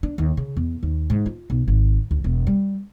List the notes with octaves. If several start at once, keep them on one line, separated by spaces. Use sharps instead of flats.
D4
D#2
C#3
E2
D#2
G#2
F4
B1
G#1
D2
E1
G3